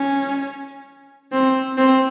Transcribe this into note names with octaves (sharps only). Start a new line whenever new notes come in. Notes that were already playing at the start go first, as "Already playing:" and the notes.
Already playing: C#4
C4
C4